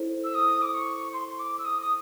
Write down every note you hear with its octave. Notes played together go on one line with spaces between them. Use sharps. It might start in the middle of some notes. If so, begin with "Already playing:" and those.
Already playing: E4 A4 C5
E6
D#6
D6
C#6
C6
D6
E6
D#6
D#6